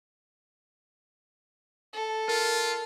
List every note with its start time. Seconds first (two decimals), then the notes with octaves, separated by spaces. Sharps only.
1.93 A4
2.28 F4 A#4